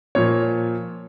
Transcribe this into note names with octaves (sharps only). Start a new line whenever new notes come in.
A#2 F3 C#5